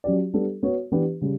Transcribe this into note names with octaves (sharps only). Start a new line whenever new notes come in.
F#3 C#4 G4 D5
G3 B3 D4 A4
B3 F#4 C#5
E3 B3 D4 G4 B4
C#3 G3